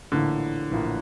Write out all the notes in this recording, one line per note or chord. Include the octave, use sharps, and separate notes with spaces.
A#1 A2 D3 E3 A#3 E4
A#1 A2 E3 A#3 E4